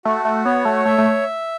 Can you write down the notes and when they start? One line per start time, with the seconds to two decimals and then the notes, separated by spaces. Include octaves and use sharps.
0.05 A3 F#4
0.25 A3
0.45 B3 C#5
0.65 A3
0.85 A3 E5
0.98 A3